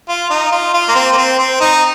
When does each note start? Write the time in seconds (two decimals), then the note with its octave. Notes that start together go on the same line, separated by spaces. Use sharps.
0.08 F4
0.30 D#4
0.52 F4
0.74 F4
0.89 A#3
0.95 C4
1.12 A#3
1.17 C4
1.39 C4
1.61 D#4